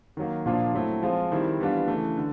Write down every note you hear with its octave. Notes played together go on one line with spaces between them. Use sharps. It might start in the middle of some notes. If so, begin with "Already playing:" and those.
D#3 F#3 A#3
A#2 F3 A#3 D4 F4
F#3 A3 C4 E4
F3 G#3 C4 F4
D#3 G3 C4 E4
E3 G3 B3 D4 F4
C#3 E3 A3
D3